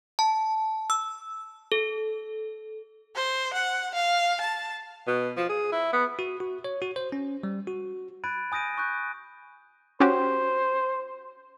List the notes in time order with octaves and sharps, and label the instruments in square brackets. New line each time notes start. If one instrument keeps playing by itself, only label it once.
[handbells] A5
E6
A4
[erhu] C5
F#5
F5
A5
[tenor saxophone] B2
F3
G#4
E4
B3
[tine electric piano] F#4
F#4
C#5
F#4
C5
C#4
G3
F#4
[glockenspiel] B5 F#6 G#6 A6 D7 D#7
G#5 D#6 G6 A#6 D7 D#7
B5 C#6 D#6 F#6 G6
[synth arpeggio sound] C#4 F#4 G4 [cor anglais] C5